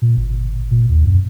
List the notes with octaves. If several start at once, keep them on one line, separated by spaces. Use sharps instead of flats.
A#2
G1
A#2
D#2
F#2